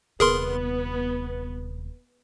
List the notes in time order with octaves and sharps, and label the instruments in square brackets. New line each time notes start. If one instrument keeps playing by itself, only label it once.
[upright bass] D#1 C3 [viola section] B3 [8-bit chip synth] G#4 A#4 C6